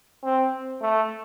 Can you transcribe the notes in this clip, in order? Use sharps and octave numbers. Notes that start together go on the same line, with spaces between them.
C4
A3